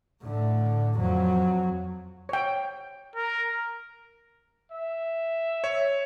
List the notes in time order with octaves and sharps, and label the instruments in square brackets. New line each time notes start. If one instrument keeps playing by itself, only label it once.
[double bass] A2 D3
F2 F#3
[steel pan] C#5 G5
[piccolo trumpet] A#4
[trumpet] E5
[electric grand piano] C#5